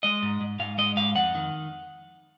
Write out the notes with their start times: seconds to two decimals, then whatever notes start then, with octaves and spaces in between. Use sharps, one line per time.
0.03 G#3 D#5
0.23 G#2
0.41 G#2
0.60 G#2 F5
0.78 G#3 D#5
0.96 G#2 F5
1.16 F2 F#5
1.35 D#3